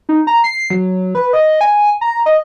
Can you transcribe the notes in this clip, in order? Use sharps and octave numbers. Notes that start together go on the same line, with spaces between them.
D#4
A#5
C7
F#3
B4
D#5
G#5
A#5
D#5